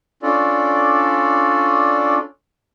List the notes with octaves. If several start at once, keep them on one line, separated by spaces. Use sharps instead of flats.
C#4 D4 F4 A4 D5